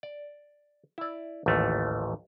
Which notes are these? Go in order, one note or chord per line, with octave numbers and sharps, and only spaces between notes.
D5
E4 D5
A1 D#2 G#2 F3 A3